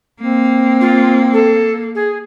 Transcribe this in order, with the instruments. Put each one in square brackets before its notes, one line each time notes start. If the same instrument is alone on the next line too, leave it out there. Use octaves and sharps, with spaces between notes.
[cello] A#3 [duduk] C4
[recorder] F4
A4
G#4